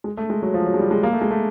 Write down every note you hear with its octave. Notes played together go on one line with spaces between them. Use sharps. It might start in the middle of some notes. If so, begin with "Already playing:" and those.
G#3
A3
G#3
F#3
F3
F#3
G#3
G3
G#3
A#3
A3
G#3
A3